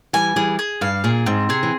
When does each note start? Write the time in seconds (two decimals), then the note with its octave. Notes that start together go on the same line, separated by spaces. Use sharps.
0.13 E3 G3 G#5
0.36 E3 G3 G#4
0.59 G#4
0.81 G2 F5
1.04 A#2 G#4
1.26 G#2 C4
1.49 C3 G#4
1.63 E3